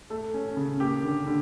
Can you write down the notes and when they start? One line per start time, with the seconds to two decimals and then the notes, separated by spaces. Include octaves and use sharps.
0.10 A3
0.34 C#4
0.57 C#3
0.80 A#3 G4
1.03 D3
1.27 D3